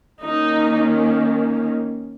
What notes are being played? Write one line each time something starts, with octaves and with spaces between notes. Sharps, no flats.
D#3 A#3 C#4 D#4